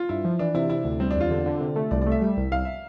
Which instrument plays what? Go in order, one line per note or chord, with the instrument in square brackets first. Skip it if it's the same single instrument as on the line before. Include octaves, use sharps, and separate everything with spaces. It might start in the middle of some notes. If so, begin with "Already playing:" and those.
Already playing: [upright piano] F4
[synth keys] G2 [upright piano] E4
[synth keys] F3
[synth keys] E3 [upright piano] D4
[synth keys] C3 [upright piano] E4
[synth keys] C3 [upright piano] E4
[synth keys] D2
[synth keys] G3 [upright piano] C4
[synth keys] E2 [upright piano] D4
[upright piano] F4
[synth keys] D3
D3
C3
A3
[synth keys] C2 [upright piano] D5
[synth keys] A3 [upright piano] D5
[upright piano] E5
[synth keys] G3
C2
[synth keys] C2 [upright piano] F5
[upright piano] E5